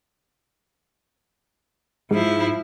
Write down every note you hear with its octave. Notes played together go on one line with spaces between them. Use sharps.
G#2 F3 E4